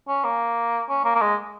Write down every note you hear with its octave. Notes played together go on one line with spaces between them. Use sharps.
C#4
A#3
C#4
A#3
A#3
G#3